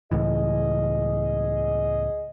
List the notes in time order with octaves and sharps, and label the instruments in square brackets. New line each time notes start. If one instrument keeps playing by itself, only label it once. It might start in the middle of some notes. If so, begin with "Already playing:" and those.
[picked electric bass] C#2 A2 E3 [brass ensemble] G#4 D#5